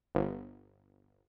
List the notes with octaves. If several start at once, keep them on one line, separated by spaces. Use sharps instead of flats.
G1